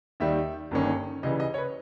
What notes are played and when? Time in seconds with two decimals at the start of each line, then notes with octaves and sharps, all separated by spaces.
0.20 D#2 D#3 G3 E5
0.71 G1 G2 D#3 A#3 C#4
1.23 C#2 C#3 E3 G3 D#5
1.40 D#5
1.54 C#5
1.58 B4